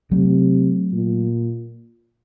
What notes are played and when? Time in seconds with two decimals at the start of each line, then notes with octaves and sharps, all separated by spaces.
0.11 C3 F#3 A3
0.93 A#2